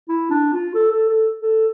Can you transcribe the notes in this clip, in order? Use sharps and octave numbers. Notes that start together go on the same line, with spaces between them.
E4
D4
F4
A4
A4
A4
A4